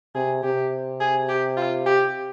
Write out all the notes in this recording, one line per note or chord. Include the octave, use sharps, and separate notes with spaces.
C3 G#4
C3 G4
G#4
G4
F4
G4